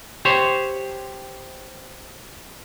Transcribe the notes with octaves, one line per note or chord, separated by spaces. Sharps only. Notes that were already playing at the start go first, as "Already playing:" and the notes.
G4 C5 C#5